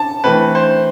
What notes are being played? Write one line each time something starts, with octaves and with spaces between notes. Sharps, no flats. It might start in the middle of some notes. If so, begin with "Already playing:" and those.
Already playing: A5
E3 A3 C4 B4
C5